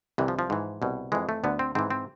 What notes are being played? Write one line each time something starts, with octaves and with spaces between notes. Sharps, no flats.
C2 C3 E3
F3
F3
G#2 E3
C2 B2
F2 E3 G#3
A3
D2 D3 B3
C4
G#2 E3 C4
C4